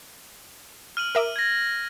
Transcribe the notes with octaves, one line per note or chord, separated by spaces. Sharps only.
F6 D#7 F#7
A#4 E5 D6
G#6 A#6